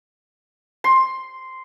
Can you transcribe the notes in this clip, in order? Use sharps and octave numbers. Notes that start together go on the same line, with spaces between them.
C6